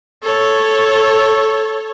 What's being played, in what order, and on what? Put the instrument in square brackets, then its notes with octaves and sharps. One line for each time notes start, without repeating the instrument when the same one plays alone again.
[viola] A4 C#5